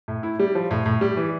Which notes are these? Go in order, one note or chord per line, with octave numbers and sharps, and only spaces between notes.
A2
E4
G3
F3
A2
A2
G3
E3